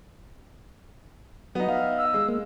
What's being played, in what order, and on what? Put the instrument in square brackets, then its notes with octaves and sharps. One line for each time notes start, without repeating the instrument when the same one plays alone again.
[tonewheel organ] F#3 [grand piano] B3 D#4
[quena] E5 [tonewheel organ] F5
[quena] E6
[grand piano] G#3
[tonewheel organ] A#3